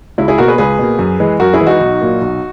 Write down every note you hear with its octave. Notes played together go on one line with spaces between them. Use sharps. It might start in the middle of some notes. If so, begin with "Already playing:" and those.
C#2 E4
E4 G#4
B2 A#3 F#4 A#4
G#4 B4
C#2 G#4 B4
B2 A#3
F#2
E3 G#3
F#2 F#4 A#4
E4 G#4
E3 G#3
D#4 F#4
B1
A#2 F#3 A#3
B1